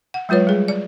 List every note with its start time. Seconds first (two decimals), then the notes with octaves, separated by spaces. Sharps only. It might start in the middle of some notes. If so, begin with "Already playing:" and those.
0.14 F#5
0.29 F#3 G#3 F4 B4 C#5
0.47 G3 G#4
0.68 D5